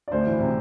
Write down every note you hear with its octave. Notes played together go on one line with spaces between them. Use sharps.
D5
D2 C5
E3
C3